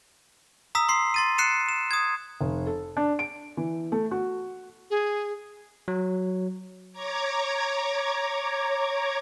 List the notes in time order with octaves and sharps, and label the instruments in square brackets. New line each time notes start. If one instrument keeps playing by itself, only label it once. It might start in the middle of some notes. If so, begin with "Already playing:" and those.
[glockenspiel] A#5 D#6 E6 B6
C6 C7
C6 A6 D#7
F#6 C7 C#7 E7
E7
D#6 G#6
[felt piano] F1
A4
D4
D7
E3
A3
F#4
[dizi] G#4
[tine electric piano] F#3
[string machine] C#5 A#5 D6 G#6